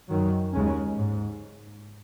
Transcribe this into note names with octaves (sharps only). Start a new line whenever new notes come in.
F#2 D#3 F#3
D#2 C#3 G#3 C#4
G#2